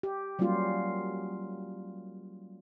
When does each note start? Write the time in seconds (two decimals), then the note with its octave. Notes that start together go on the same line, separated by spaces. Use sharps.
0.03 G4
0.39 F#3 G3 A#3 C#4 F4 G4